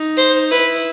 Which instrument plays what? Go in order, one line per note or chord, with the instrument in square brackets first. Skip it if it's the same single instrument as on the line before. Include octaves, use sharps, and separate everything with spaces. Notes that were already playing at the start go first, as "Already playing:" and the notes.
Already playing: [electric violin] D#4
[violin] C5
[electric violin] E4 [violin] B4